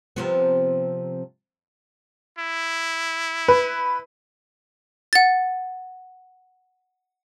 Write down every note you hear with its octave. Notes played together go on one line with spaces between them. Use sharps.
C3 F3 B3
E4
B4
F#5 A6